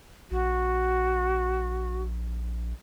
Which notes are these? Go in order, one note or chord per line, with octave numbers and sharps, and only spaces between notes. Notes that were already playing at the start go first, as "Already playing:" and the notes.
A#1 F#4